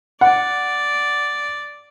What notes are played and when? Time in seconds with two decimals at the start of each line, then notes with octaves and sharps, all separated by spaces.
0.21 D5 F#5